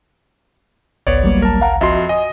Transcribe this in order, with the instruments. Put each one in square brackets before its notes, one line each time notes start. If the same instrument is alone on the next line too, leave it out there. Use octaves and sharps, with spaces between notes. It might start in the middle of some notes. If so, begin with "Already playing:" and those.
[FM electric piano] G#1 C#2 [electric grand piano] B3 C#5 D5
[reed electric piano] F#3 G3 A#3
[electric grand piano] A#4 A5
[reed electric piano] F5 F#5 A#5
[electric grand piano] F2 C6 [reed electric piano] F#4 D#5 E5
[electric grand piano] D#5 [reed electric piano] G#5 D#6